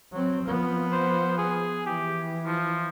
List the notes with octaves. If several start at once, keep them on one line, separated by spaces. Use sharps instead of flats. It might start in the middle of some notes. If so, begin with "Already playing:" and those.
F#3 C4
F3 B3
C5
G#4
E3 G4
F3